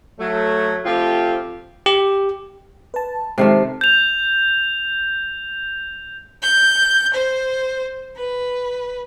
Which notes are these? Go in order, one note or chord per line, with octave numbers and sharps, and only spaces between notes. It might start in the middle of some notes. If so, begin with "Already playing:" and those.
F#3 A3
F3 A3 C4 F4 G4
G4
B4 A5
C3 D#3 G#3 A3 G5 C7
G6 F7
G6
C5
B4